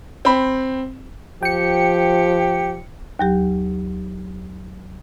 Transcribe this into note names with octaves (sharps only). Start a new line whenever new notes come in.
C4 B5
F3 G4 G5 C#7
D#2 F#3 G4